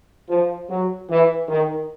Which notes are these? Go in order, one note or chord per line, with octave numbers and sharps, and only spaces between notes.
F3
F#3
E3
D#3